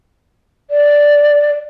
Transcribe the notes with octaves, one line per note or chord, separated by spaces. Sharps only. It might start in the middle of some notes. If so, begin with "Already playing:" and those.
D5